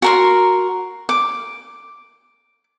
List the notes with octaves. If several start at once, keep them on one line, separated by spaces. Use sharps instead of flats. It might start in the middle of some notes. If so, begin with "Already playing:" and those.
F#4 A#4 C6
D6